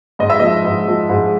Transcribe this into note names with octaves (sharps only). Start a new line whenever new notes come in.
G#2 D#5
E5
F3 D#5
G#2
F3
G#2